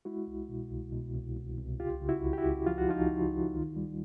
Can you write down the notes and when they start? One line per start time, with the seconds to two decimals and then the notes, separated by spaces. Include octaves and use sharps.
0.05 G#3 E4 F#4
0.28 C2
0.49 B2
0.71 C2
0.93 B2
1.14 C2
1.37 C2
1.58 C2
1.80 C#2 F4 G4
2.02 C#3
2.09 E4 F#4
2.23 C#2
2.33 G4
2.37 E4 F#4
2.45 C#2
2.67 F3 F4
2.78 F#4
2.88 F3 D#4 F4
3.11 C#2
3.32 C#2
3.54 D#3
3.76 G3